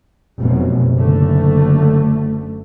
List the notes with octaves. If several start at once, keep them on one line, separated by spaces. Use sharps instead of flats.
F1 F#2 B2
F#1 D3 A3